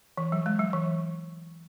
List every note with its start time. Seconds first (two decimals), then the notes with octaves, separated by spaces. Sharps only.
0.17 E3
0.32 F#3
0.46 G#3
0.59 F#3
0.73 E3